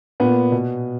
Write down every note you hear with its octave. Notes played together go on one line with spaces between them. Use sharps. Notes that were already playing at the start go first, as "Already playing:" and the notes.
A#2 B3
B2